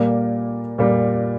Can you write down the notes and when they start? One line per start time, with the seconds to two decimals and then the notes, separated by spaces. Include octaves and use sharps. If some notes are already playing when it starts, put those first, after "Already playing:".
Already playing: A#2 G3 A#3
0.78 A#2 G3 A#3